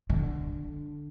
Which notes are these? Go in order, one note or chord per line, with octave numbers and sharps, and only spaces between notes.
D3